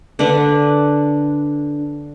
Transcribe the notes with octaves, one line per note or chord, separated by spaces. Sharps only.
D3 D4 B4 F#5